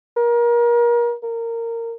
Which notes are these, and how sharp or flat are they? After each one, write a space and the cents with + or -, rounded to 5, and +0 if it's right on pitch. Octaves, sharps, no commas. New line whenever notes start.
A#4 +30
A#4 -20